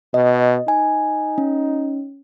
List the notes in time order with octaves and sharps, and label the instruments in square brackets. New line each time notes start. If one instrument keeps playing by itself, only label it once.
[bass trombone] B2 [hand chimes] D#5
[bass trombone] D#4 [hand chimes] G#5
[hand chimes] C#4